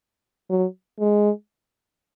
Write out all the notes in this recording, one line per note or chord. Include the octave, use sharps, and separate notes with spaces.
F#3
G#3